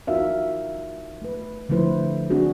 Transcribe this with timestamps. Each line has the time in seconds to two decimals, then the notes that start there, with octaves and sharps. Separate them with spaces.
0.07 D#4 F4 F#4 A#4 E5 F5
1.22 A3 B4
1.69 D3 F3 A3 E4 B4 C5
2.30 C4 D4 F#4 G#4